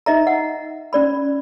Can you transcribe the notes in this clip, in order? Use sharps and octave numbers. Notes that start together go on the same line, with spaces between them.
D#4 D#5 E5 A#5
F#5
C#4 D5 B5